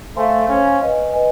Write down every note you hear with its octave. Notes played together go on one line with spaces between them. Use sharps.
A3 C5 F5 G#5 C6
C#4 C5 F5 G#5 C6
B4 D#5 G#5
B4 D#5 G#5